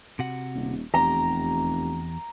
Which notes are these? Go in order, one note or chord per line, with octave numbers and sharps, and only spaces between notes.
C3 F#4 F#5
D#1
F1 E2 G4 A#5